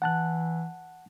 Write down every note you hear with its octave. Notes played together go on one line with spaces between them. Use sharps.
E3 F#5 A5 F#6